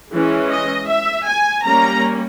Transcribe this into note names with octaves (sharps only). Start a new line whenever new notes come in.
E3 G#3 C#4
D#5
E5
G#5
G3 A#3 C#4 A#5